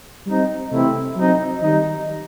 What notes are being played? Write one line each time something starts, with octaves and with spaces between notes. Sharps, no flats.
G3 C4 D#4
C3 E3 A3 C4 E4
F#3 C4 D#4
D#3 G3 D#4